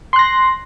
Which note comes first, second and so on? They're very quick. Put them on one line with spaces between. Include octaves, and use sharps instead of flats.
C6 F#6 A#6